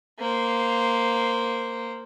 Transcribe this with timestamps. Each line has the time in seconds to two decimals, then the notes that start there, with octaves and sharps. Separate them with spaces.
0.19 A#3 C5